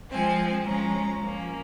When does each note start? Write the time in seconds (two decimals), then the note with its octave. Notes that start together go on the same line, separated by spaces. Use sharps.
0.11 F3 G#3 C4 G#5
0.66 F3 G#3 C#4 A#5
1.22 F3 A#3 C#4